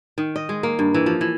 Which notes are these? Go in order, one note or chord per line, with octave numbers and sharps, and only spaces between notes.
D#3
D#5
G#3
A#3
G2
E3
F3
E3